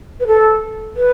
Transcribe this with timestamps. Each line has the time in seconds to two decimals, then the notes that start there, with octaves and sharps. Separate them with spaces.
0.20 B4
0.27 A4
0.96 B4